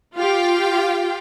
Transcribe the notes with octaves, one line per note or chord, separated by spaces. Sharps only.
F4 G4 F5 G5